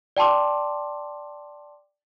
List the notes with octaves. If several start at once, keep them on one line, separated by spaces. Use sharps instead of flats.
D5 G5 A5 C6 D6